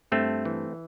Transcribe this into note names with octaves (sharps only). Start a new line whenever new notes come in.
G2 A3 C4
E3